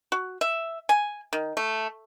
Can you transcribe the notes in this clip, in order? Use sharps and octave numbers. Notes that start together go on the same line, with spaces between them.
F#4
E5
G#5
D#3
A3